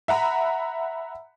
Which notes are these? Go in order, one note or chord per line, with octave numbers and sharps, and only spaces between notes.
E5 F#5 A#5 B5